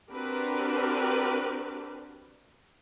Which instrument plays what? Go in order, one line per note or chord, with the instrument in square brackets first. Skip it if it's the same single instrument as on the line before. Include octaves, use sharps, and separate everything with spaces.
[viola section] C4 D4 F#4 G4 A#4 B4